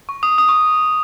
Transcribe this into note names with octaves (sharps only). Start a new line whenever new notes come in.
C#6
D#6
D#6
C#6